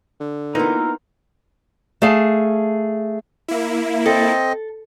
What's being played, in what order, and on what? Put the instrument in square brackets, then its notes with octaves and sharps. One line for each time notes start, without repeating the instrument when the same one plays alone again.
[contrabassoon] D3
[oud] E3 A#3 F4 [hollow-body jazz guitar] B3 D#4 [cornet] A#4
[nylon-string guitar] A3 G#4 F5 A5
[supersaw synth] A#3 E4
[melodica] C4 D#5 [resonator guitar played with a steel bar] A4